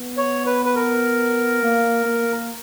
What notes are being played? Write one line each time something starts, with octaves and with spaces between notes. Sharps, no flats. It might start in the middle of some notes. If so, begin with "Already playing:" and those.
Already playing: B3
C#5
B4
B4
A#4
A#3
A#3